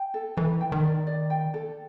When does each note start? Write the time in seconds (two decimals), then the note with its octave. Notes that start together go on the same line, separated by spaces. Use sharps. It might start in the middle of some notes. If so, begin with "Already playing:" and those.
Already playing: G5
0.14 A4
0.37 E3 A4
0.61 G5
0.72 D#3
0.84 D5
1.07 D5
1.30 G5
1.54 A4